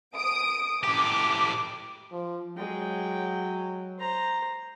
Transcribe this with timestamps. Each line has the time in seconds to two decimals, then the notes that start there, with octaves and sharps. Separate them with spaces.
0.14 D#6 D7
0.83 A2 G4 D6
2.12 F3
2.58 F#3 G#3 G5
4.00 C5 A#5